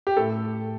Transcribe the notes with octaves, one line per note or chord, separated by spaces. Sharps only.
G4
A2 A3 A4